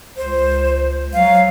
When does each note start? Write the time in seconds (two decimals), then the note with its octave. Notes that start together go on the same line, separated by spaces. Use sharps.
0.17 C#2 C5
1.13 F#3 F5